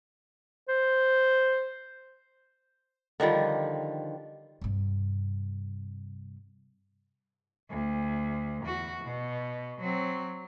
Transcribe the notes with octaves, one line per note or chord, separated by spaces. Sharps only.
C5
D3 D#3 F3 G3
G2 C3
D2
E2 F#4
B2
F#3 C4